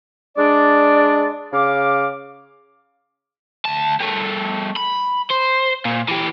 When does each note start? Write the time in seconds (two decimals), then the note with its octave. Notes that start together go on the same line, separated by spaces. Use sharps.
0.36 G#3 D4 D5
1.53 C#3 F5 D6
3.65 D2 A5
4.00 G3 A3
4.77 B5
5.31 C5
5.85 A#2
6.08 E3 G4